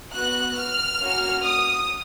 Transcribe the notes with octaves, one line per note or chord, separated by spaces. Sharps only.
B3 F#4 F#6
F6
A#3 C#4 F#4
D#6